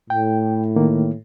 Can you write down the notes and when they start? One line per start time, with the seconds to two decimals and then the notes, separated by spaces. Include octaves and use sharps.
0.10 A2 G5
0.76 D#3 A#3